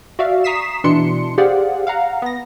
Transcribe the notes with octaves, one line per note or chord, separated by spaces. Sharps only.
F#4 D5 E5 F5
A#5 C#6 D#6 B6 C7 E7
B2 E3 D4 C6 C#7
G4 G#4 C5 D5 F5 F#5
F5 F#5 A#5
B3 A#6